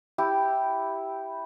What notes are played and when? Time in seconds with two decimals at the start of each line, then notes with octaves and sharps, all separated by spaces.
0.18 E4 G4